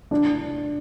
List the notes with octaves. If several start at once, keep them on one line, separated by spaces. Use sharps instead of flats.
D4